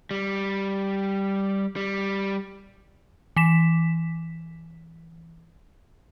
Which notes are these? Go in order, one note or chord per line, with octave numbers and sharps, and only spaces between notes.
G3
G3
E3 B6 E7